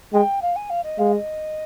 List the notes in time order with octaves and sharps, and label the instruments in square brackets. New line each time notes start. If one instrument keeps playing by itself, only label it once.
[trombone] G#3 [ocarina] G5
[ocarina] F5
G#5
F5
D#5
[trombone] G#3 [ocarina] F5
[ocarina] D#5